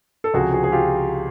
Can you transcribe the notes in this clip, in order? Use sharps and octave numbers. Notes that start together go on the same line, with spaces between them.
A4
C#2 C3 F3 F#4 G#4
F#4 G#4
G#4
F4 G4